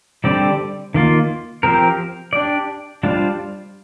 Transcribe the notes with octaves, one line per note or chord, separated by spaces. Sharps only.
D3 G3 C4 G4 D5
D#3 A#3 F4
F3 C4 G4 A#4
D4 G4 D5
G3 D4 F4 C5